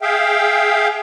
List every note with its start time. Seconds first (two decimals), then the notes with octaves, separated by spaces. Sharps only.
0.01 G#4 E5 F5 G5